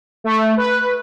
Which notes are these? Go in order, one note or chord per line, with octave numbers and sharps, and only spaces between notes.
A3
B4